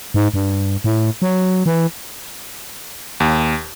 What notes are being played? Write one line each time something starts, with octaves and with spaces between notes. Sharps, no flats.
G#2
G2
A2
F#3
E3
D#2